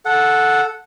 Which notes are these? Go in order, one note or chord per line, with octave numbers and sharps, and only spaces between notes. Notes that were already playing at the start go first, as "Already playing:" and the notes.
A4 F#5